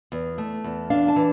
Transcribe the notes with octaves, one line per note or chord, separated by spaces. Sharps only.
E2
A3
E2
D4 F5
A5
E3